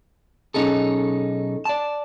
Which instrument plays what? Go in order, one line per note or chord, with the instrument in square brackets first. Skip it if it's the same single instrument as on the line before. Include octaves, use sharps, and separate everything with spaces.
[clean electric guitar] B1 C#4 D#4 G#4 A4
D5 A5